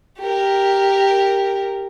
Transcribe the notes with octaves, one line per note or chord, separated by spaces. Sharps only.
G4 A#4